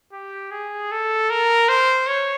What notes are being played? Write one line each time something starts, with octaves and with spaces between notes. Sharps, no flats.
G4
G#4
A4
A#4
C5
C#5